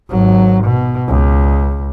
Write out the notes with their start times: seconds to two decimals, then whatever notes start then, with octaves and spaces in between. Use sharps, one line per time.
0.11 G#1 F#3
0.65 B2
1.09 C#2